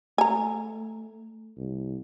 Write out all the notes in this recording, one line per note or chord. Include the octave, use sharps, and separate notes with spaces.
A3 G#5 A#5
C2